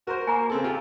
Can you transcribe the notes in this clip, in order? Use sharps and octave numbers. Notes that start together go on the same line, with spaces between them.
F#4 A#4 C5
A#3 G#5 A#5
C#3 C4 A4
F4 G4